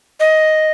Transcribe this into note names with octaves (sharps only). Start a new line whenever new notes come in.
D#5